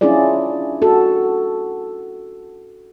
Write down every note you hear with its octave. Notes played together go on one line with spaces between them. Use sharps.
C#4 D4 E4 F4 G#4 D5
F#4 A4